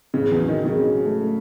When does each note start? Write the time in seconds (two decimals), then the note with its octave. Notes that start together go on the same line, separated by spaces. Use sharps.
0.14 A1 C#3
0.31 E2
0.37 F#3
0.48 D#3
0.59 F#3
0.65 C#3
0.82 F#3
1.05 A3